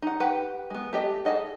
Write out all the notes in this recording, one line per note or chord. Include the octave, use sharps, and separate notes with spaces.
D#4 F#5
G4 B4 F#5 G5
G#3 B3
A3 G4 D#5
G#4 A4 D#5 F#5